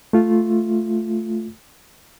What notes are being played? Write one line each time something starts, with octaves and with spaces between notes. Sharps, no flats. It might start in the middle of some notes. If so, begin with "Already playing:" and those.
A3 F4